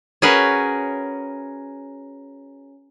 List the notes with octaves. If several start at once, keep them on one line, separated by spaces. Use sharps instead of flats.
C#4 F#4 G#4 A#4 B4